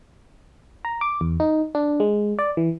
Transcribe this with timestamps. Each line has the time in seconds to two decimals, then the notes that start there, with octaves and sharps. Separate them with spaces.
0.85 A#5
1.01 D6
1.21 E2
1.40 D#4
1.75 D4
2.00 G#3
2.39 D5
2.57 E3